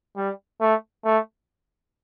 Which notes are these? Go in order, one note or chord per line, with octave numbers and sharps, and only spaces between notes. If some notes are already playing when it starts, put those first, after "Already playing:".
G3
A3
A3